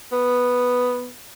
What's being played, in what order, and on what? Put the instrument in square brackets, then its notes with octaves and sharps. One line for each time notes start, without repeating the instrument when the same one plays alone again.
[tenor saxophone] B3